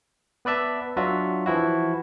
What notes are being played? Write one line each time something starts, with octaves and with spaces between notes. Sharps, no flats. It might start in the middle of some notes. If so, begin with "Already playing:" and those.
B3 B4 D5 E5 A5
F#3 D4 F4 F#4 E5
E3 F3 E4 F#4